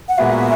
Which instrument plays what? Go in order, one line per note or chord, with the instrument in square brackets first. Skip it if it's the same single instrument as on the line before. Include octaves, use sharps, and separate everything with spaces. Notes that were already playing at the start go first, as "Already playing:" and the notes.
[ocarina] F#5
[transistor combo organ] A#2 G#3 B3 F#4 [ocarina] E5